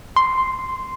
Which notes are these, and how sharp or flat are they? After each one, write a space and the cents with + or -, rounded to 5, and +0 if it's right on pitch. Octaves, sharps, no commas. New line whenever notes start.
C6 -5